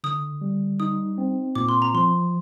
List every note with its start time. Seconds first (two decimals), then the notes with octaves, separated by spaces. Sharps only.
0.04 D3 D#6
0.41 G3
0.80 D#4 D#6
1.18 C4
1.55 A#2 D6
1.69 C6
1.82 A#5
1.94 F3 C6